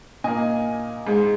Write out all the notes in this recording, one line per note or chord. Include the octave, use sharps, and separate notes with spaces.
A#2 A#3 D#5 G#5
G#2 G#3